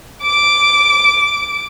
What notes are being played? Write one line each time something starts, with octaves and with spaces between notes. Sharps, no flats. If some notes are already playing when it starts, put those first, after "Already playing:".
D6 D7